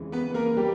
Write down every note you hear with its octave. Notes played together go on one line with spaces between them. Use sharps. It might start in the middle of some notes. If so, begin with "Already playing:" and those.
Already playing: F2 C#3 E3 G#3
B3 B4
A#3 A#4
G3 G4